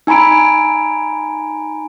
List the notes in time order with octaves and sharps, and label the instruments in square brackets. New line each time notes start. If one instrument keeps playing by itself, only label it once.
[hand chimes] D#4 G#5 A#5 B5 D7